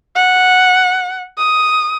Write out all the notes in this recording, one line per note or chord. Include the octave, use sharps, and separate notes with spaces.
F#5
D#6